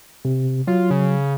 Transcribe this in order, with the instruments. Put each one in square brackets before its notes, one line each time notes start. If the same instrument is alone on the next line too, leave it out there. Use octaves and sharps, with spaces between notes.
[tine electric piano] C3
[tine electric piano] F#3 [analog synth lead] F4
[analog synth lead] C#3